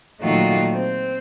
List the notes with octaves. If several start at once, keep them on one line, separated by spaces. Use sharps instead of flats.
A#2 D#3 F#3 A3 F4 F#4
C4